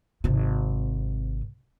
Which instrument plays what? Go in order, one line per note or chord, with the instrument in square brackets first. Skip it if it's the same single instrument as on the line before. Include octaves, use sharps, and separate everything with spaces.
[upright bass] G#1 C3